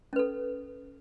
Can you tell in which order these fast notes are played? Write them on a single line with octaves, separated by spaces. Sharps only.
C#4 B4 A4